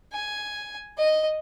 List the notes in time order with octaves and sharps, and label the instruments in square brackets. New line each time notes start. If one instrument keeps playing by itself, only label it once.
[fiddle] G#5
D#5